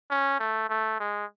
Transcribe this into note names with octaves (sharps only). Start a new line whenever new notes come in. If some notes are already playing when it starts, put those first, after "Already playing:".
C#4
A3
A3
G#3